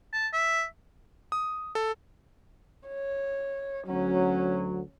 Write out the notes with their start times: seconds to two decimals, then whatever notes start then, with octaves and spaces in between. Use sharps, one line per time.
0.13 A5
0.33 E5
1.32 D#6
1.75 A4
2.88 C#5
3.87 D2 F#3 C#4